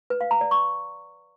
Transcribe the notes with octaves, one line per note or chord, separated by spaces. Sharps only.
B4
F5
A#5
D5
C#6